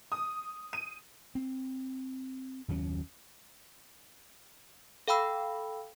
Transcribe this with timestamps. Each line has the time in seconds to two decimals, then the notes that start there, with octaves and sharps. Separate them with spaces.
0.12 D#6
0.73 D#7
1.35 C4
2.68 F#1 D#2 F#3 C#4
5.08 A4 F5 G5 B5 E6